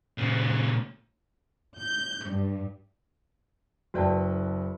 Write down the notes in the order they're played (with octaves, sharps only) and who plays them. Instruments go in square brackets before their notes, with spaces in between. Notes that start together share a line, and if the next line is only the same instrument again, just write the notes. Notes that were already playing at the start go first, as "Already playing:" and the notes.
[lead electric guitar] A#2 C#3
[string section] G6
G2
[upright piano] F#1 B4 G5 [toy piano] F#4 D5 A5